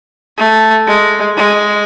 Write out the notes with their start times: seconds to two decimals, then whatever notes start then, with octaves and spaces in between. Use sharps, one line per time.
0.38 A3
0.87 G#3
1.37 G#3